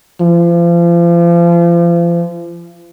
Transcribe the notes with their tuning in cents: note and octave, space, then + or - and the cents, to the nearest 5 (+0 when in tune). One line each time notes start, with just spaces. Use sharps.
F3 -35